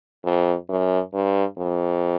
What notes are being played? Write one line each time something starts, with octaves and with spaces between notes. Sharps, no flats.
F2
F#2
G2
F2